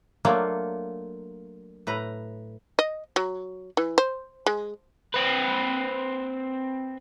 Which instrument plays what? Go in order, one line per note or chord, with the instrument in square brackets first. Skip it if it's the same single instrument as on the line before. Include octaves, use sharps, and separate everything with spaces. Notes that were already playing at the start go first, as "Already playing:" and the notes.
[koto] F#3 A3 A#3 D4 F4 C#5
A2 B4 A#5
[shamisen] D#5
F#3
E3
C5
G#3
[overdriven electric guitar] C4 B4